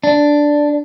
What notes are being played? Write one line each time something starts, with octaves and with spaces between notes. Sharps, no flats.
D4